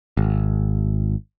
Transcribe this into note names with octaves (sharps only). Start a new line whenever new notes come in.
G#1